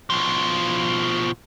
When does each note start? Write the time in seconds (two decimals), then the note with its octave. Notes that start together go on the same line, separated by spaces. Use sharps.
0.10 B2 F3